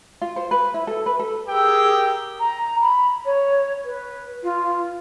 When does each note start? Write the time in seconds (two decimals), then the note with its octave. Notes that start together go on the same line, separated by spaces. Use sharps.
0.22 F4
0.36 C5
0.51 B4
0.74 E4
0.87 A4
1.06 B4
1.19 A4
1.49 G4 G#4 A#4 G5 E6
2.40 A#5
2.82 B5
3.25 C#5
3.85 B4
4.43 F4